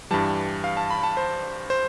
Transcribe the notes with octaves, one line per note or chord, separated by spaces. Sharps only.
G2 E3 G3 A5
F5
A5
B5
A5
C5
C5